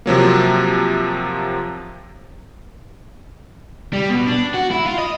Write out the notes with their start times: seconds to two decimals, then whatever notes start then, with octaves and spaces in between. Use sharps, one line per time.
0.06 C3 F3 F#3 A#3
3.93 G3
4.10 B2
4.27 D4
4.54 F#4
4.71 E4
4.86 F4
4.98 D#5